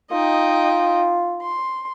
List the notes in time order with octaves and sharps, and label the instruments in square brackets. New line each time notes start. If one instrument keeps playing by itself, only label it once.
[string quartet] D#4 D#5 G5 [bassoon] F4
[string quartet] C6